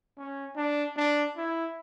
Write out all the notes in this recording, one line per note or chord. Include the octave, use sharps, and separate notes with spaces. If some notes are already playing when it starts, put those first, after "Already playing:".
C#4
D4
D4
E4